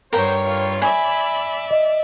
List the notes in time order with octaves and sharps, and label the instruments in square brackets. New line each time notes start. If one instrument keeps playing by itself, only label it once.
[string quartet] G2 C#5 [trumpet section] B3 C5 [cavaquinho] A#4 G5
[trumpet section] A#3 E4 F4
[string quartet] D5 E5 [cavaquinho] G#5 [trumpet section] B5
[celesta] D#5